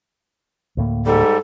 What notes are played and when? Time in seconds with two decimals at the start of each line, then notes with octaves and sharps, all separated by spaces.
0.77 D2 A2 A#3
1.06 G#2 G3 A4